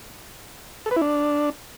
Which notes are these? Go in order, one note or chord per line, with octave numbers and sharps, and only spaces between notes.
A4
B4
E4
D4